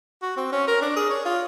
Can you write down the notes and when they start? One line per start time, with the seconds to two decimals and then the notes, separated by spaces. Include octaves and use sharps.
0.22 F#4
0.37 C4
0.53 C#4
0.68 A#4
0.82 D4
0.96 G#4
1.10 C#5
1.25 F4